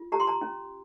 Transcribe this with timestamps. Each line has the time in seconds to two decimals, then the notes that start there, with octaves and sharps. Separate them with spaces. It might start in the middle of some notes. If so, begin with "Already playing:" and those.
Already playing: F4
0.12 G4 A#5
0.20 C6
0.27 A#5
0.41 C#4